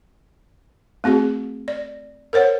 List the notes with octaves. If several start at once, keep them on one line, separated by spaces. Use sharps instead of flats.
A3 C4 F#4 G#4
D5
A#4 C5 C#5 F#5